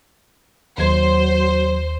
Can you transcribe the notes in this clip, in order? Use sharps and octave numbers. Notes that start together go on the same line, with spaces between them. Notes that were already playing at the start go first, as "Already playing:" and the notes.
D#2 F#3 C5 G#6